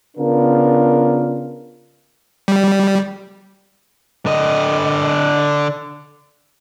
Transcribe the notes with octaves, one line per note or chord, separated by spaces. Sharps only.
C#3 B3 D4 F4 A#4
G3
D3 D#5